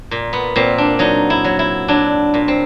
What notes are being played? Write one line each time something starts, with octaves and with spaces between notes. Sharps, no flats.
A#2
B3
A#2 C4
D4
F#3 D#4
E4
F#3
E4
F#3 D4
A#2
C4